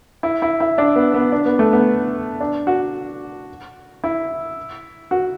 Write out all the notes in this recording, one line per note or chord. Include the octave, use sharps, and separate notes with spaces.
E4
E4
E4
D4
B3
B3
D4
B3
A3
B3
D4
F#4
E4
F#4